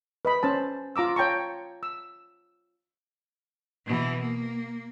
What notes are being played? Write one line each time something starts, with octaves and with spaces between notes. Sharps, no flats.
B4 D#5 B5
C#4 C5 A5
F4 A#5 D6 E6
C#5 G5 A5 A#5 C#6
E6
B2 E3
A#3